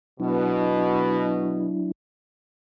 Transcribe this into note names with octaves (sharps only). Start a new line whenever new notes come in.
B2 F#3 D4 E4